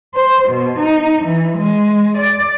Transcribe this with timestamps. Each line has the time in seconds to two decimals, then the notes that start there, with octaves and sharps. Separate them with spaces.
0.14 C5
0.49 B2
0.79 D#4
1.24 E3
1.58 G#3
2.18 D5